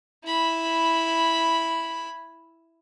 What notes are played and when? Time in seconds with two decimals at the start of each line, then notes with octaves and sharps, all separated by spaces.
0.25 E4 B5